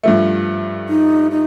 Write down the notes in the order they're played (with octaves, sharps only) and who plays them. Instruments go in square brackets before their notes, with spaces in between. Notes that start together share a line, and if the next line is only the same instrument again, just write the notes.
[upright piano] G2 F3 A3
[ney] D#4
D#4